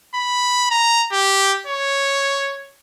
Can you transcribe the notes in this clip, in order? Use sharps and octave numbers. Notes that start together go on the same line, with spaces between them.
B5
A#5
G4
C#5